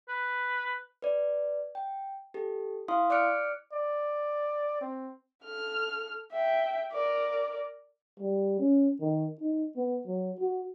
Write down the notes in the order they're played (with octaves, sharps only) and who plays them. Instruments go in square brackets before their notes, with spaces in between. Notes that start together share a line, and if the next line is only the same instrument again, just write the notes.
[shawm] B4
[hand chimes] B4 D5
G5
G4 A4
E4 F5 C6 D#6
D5 D6 F6 F#6 C#7 D7
[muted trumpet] D5
C4
[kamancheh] A4 F6
E5 G5
A#4 D5
[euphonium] G3
C#4
D#3
D#4
B3
F#3
F#4